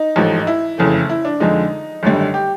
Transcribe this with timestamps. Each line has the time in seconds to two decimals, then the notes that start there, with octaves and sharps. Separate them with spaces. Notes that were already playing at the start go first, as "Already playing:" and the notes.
Already playing: D#4
0.16 A1 G#2 F3 A3
0.39 D#4
0.47 E4
0.78 F#1 F2 C#3 E3 A3
1.09 E4
1.25 D4
1.40 F2 D3 F3 G#3 D#4
2.03 G#1 F#2 D3 G3
2.34 G4